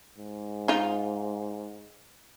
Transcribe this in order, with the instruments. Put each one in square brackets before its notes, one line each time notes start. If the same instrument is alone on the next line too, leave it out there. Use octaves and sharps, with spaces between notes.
[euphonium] G#2
[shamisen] D#4 F4